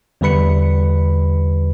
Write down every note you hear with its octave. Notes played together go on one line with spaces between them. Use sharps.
E2 D3 G3 B4 B5 C#7